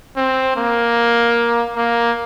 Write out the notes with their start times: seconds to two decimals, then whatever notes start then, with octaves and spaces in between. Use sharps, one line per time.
0.17 C4
0.57 A#3
1.76 A#3